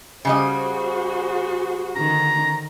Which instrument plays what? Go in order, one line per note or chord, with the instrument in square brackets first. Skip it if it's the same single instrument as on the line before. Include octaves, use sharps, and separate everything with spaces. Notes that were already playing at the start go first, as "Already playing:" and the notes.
[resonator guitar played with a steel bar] C#3 G3 D#5 [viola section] F#4 G#4 C5
[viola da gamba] D3 D#3 [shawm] A#5